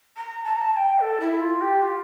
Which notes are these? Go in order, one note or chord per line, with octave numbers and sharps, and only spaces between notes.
A#5
A5
A#5
A5
A5
G5
A4
E4
F4
G4
F4